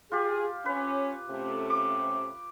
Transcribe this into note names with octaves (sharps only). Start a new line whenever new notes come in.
F4 G4 G#4
C#4 B4
C3 A3 C#4
D6